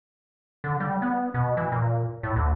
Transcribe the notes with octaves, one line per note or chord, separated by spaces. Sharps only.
D3
G3
B3
B2
E3
A#2
A2
D2